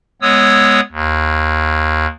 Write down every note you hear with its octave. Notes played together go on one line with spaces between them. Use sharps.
G#3 B3 C#5 D#6 E6
D#2